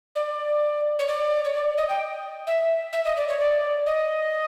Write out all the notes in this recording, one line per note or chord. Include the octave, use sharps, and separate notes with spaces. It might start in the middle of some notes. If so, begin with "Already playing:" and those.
D5
C#5
D5
C#5
D5
D#5
G5
E5
E5
D#5
D5
C#5
D5
D#5